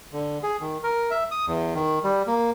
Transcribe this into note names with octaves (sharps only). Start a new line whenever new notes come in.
D3
G#4
D#3
A#4
E5
D#6
E2
D#3
G3
A#3